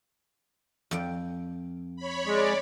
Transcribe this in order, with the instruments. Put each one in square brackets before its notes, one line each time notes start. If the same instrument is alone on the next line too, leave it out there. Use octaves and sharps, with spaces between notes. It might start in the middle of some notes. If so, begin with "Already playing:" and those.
[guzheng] F2 G5
[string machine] C#5 B5
[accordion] G#3 [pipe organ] D5